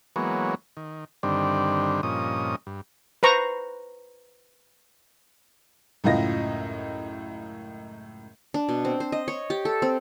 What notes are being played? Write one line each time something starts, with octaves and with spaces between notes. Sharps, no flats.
E3 F#3 G#3 A#3 B3 C#5
D#3
G2 D3 D#3 G3 C4 D4
G2 A#2 F3 C#4 D#5 D#6
G2
B4 C5 A#5 C#6
C#2 F#2 A2 F4 D#5 A#6
D4
B2
C4
C5
D#5
C#5
G4
A4
C4